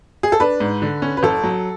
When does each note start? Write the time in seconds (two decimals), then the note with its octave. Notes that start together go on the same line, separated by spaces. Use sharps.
0.23 G#4
0.32 A4
0.40 D4 B4
0.60 G#2
0.82 D3
1.02 C#4
1.17 B4
1.23 F#1 A4
1.44 F#3